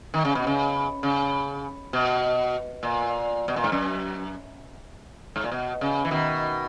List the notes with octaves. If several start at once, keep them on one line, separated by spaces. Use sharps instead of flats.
D#3
C#3
B2
C#3
C#3
B2
A#2
B2
A#2
G#2
F#2
G#2
A#2
B2
C#3
E3
B2 D#3